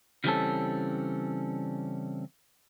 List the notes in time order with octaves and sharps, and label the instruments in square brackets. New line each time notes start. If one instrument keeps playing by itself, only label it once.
[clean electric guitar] C#3 E3 G3 C4 C#4 A4